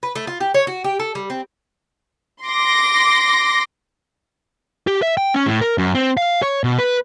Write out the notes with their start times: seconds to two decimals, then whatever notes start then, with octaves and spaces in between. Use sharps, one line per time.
0.03 B4
0.15 A3
0.27 F4
0.40 G4
0.54 C#5
0.67 F#4
0.84 G4
0.99 A4
1.15 G3
1.30 C4
2.44 C6 D6 A#6
4.87 G4
5.02 E5
5.17 G5
5.34 C#4
5.46 A2
5.61 A#4
5.78 F#2
5.95 C4
6.17 F5
6.42 C#5
6.64 B2
6.78 B4